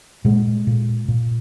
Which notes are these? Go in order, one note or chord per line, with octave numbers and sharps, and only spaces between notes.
A#2 G#3
A#2
A#2